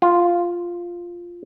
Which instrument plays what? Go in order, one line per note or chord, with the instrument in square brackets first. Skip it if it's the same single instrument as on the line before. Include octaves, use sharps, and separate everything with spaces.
[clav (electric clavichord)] F4